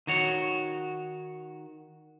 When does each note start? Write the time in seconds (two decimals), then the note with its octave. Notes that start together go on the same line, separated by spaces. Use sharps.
0.07 D#3 F#4 C#5